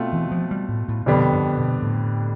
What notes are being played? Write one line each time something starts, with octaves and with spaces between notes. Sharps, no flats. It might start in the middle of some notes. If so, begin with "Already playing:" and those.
Already playing: B2 A3 C4 F4
E3
F3
G3
A2
A2
F2 B2 D3 G3 B3 D4
G2
B2
A2